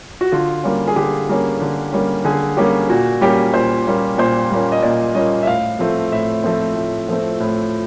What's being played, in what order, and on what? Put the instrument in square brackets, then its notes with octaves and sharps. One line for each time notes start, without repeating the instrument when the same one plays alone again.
[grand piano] F#4
D3 F4
G3 A#3 C#4
G#4
D3 G4
G3 A#3 C#4
D3
G3 A#3 C#4
D3 G#4
G3 A#3 C#4 G4
A#2 F#4
G3 A#3 C#4 G4
A#2 C5
G3 A#3 C#4
A#2 C5
G3 A#3 C#4
D#5
A#2 D5
G3 A#3 C#4 D#5
E5
A2 F5
F3 A3 C4
A2 E5
F3 A3 C4
A2
F3 A3 C4
A2